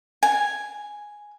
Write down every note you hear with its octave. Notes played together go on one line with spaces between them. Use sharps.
G#5